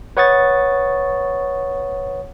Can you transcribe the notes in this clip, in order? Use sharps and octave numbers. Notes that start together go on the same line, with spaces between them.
B4 C#5 F#5 C#6 D#6 A6